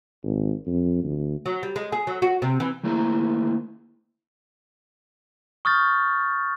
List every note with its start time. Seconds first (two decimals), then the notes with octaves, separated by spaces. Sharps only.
0.23 G#1
0.67 F2
1.03 D2
1.46 F#3
1.63 G3
1.76 G#3
1.92 G#4
2.07 F#3
2.22 F#4
2.42 C3
2.60 E3
2.83 D#3 A3 A#3 E4 C5 A#5
5.65 C#6 D#6 F6 G6 A6